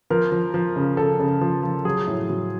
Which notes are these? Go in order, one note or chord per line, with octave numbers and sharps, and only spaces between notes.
F3 A#4
F3
F3
C#3
C#3 A4
C#3
F3
F3
F#3 G#4
A2
F#3